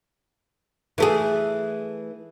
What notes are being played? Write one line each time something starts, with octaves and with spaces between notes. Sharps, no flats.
E3 A3 G#4